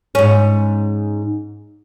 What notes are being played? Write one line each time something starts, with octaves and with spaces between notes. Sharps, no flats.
G#2 C#4